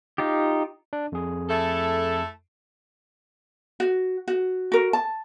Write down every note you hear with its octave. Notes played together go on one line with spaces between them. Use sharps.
D#4 F4 G4
D4
F2 G#4
A3 E4 A4
F#4
F#4
F#4 A#4
A5